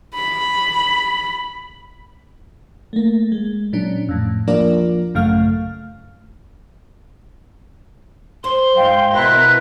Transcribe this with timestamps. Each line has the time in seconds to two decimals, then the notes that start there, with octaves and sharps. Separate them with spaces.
0.15 B5
2.93 A3 A#3
3.32 G#3
3.73 A#2 F#3 C#4 D4
4.09 F2 A2
4.47 F3 A#3 D4 F4 A#4 D5
5.14 A1 F#2 C#3 A3 F5 F6
8.44 C5 C6
8.75 G#2 G#3 F5 G5
9.13 B2 E4 A#4 B4 F#6